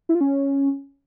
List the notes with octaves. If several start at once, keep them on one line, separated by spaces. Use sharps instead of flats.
E4
F4
C#4